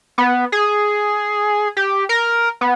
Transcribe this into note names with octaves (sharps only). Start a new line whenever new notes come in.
B3
G#4
G4
A#4
B3